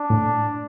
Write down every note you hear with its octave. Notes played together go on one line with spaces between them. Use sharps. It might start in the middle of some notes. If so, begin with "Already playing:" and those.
Already playing: D4
A2